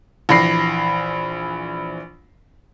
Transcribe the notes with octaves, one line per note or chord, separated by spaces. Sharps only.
A#1 E3 B5 A#6 C7